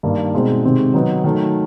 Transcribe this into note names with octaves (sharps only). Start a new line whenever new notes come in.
G2 D#3 G3 A#3
B2 G#3 C4 D#4
C3 D#3 G#3 C4
D#3 F#3 B3 D#4
D#3 F#3 A3